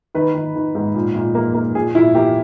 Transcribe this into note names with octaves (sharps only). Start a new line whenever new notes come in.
D#3 B4
D#3
D#3
G#2
A#2
A#2
A#3
A#3
A#2 G#4
A#2 E4
A#3 G4